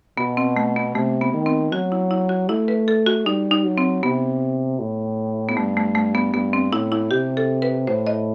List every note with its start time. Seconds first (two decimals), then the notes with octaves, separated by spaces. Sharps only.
0.17 B2 B3
0.37 C4
0.57 A3
0.76 B3
0.95 C3 A3
1.21 B3
1.33 D#3
1.46 C4
1.72 F#3 F#4
1.92 E4
2.11 E4
2.29 F#4
2.49 A3 E4
2.68 B4
2.88 A4
3.06 F#4
3.26 G3 D#4
3.51 D#4
3.64 F#3
3.78 C4
4.03 C3 B3
4.79 A2
5.49 B3
5.57 G2 A3
5.77 A3
5.95 A3
6.15 B3
6.34 G2 B3
6.53 C4
6.72 A2 E4
6.92 E4
7.11 C3 G4
7.37 A4
7.62 B4
7.87 A2 C5
8.07 D#5